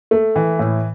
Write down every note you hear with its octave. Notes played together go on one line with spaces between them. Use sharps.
A3
E3
A2